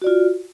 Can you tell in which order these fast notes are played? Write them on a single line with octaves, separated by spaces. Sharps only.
F#4 D5 F4